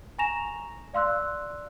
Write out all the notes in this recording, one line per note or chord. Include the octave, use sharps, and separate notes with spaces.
G#5 A#5 C#6 A#6 E7 F7
D5 F5 C6 E6 F#6